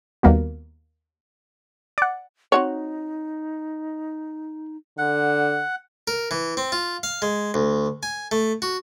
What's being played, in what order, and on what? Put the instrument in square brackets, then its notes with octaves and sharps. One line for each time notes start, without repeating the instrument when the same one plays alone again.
[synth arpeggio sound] D#2 G3 A#3 B3 F#4
D5 F#5
[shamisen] C4 F#4 C#5 [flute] D#4
[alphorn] D3 [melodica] F#5
[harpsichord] A#4
E3
C4
F4
F5
G#3
D2
G#5
A3
F#4